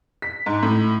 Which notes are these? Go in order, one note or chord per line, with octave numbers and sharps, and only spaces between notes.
B6
G#2
A2